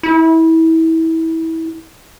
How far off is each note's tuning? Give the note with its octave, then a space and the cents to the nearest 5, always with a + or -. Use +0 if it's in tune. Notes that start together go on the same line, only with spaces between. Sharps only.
E4 -25